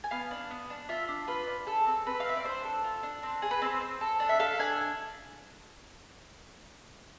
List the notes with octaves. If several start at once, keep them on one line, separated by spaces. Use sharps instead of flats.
G#5
B3 F5
D4
B3
D4
F4 E5
D4
F4 B4
D4
G#4 A4
C4
C4 B4
F5
C4 E5
D5
D4 C5
A4
F4
D4
C4
G#4
B4
C4 C5
C4
A4
D4
E5
A4 F5
D4 G#5